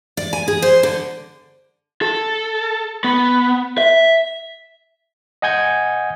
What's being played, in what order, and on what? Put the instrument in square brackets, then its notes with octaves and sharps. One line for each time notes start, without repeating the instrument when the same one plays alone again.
[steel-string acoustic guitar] D5
G#5
G#4
C5
D3
[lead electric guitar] A4
B3
E5
[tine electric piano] D#5 F#5 G#5 G6 G#6